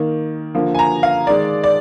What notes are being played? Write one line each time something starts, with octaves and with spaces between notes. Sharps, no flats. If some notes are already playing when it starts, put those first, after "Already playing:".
Already playing: D#3 A#3
D3 F3 A#3
G#5
A#5
F5
D#3 G#3 D5
D5